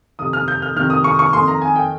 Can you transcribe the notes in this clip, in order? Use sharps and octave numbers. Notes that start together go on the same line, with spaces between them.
F2 C3 D#3 D#6
F6
G6
F6
F2 C3 D#3 F6
D#6
C#6
C#6
F2 D#3 C6
A#5
G#5
G5